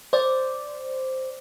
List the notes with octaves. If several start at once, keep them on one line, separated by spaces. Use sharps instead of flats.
C5 D5